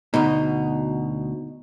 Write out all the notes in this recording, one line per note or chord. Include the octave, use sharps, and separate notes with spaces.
D2 B2 D#4